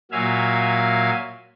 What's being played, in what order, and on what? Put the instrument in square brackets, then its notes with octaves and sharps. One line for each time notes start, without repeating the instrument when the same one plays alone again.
[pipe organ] A#2 F#3 E5 F5 G#5